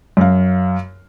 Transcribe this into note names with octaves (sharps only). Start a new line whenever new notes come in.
F#2 F5